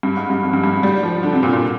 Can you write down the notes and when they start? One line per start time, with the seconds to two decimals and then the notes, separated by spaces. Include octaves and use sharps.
0.03 G2
0.17 G#2
0.30 G2
0.43 F2
0.53 G2
0.64 G2
0.73 G#2
0.83 G3
1.03 F3
1.23 D3
1.33 C3
1.43 A#2
1.53 A#2